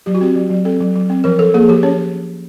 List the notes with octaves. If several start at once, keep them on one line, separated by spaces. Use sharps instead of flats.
F#3 G4
F#4
C4 G4
F#3
F#3
C4 A4
F#3
F#3
C4
F3 A#4
F3 A4
A#3 G#4
F3 G4
C#4 C#5